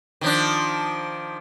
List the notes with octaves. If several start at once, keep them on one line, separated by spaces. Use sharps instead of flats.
D#3 F3 D4